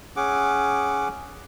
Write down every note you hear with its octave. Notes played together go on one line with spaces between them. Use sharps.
C#4 G#4 F#5 D6